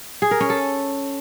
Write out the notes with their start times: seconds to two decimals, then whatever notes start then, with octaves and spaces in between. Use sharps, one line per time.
0.22 G#4
0.31 A#4
0.40 C#4
0.50 A4